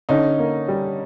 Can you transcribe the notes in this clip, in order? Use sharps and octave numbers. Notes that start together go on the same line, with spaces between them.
D3 C#4 D#4
A#3
G3